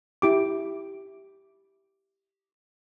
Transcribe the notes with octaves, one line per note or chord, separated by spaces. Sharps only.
E4 G4 D6